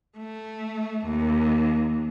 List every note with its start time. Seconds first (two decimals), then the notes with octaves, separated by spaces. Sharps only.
0.18 A3
1.06 D#2